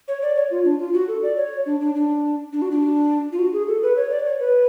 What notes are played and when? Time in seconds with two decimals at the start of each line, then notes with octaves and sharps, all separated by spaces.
0.08 C#5
0.22 D5
0.36 C#5
0.51 F4
0.65 D4
0.79 F4
0.94 F#4
1.08 A4
1.23 D5
1.37 C#5
1.66 D4
1.81 D4
1.95 D4
2.53 D4
2.62 F#4
2.71 D4
3.32 F4
3.39 F#4
3.53 G#4
3.68 A4
3.83 B4
3.97 C#5
4.10 D5
4.25 C#5
4.40 B4